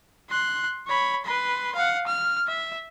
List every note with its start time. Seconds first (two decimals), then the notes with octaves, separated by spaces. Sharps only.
0.30 C6 F#6
0.87 C#5 B5
1.25 B4 C6
1.75 F5 F#5
2.07 F6
2.47 E5